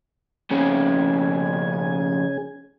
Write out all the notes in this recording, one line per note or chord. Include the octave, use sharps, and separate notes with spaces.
F2 C#3 C#4 G#4 G#5